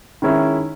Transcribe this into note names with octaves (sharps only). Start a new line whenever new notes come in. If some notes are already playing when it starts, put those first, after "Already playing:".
D#3 G#3 C#4 E4